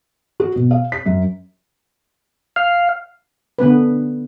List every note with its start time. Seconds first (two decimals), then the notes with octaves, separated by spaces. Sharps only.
0.40 F#4
0.56 B2
0.71 F5
0.92 B6
1.06 F#2
2.56 F5
3.59 D3 B3 C#4 B4